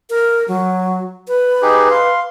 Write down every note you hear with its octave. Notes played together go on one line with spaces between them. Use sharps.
A#4
F#3
B4
D#4 G4 G#4
F5 C6